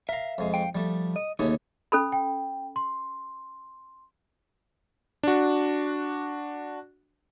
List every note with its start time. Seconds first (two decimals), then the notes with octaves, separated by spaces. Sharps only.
0.09 A#4 E5 F5 A#5
0.38 F2 G#3
0.54 F5 G5
0.75 F3 G3 A3
1.16 D#5
1.39 D#2 C#3 A3 D#4
1.92 C#4 A4 B5
2.12 G5
2.76 C6
5.23 D4 F#4